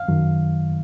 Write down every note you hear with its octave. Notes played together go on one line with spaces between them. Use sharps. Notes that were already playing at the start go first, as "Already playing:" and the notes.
Already playing: F5
F#2 D#3 F#3